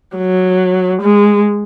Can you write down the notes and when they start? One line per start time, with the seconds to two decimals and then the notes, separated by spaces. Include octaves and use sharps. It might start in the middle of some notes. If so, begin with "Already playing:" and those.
0.17 F#3
1.02 G#3